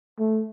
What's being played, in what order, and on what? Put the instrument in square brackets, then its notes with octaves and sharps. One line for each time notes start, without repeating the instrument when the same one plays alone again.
[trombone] A3